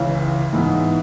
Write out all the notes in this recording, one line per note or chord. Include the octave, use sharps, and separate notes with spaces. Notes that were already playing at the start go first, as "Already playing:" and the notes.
Already playing: C#2 C#3 E3
G#2 E3 B3